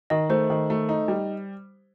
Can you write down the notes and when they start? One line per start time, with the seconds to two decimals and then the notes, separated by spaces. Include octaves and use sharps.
0.10 D#3 D#5
0.30 A3 C5
0.50 D#3
0.70 A3
0.89 D#4
1.08 G3